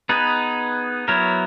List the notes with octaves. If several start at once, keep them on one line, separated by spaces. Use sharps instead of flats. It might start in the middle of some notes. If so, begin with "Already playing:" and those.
B3 D#4 G#4 B4
F#3 B3 E4 A#4 C#5